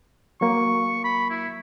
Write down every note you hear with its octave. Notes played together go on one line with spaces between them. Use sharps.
F#3 A#3 C#6
B5
E4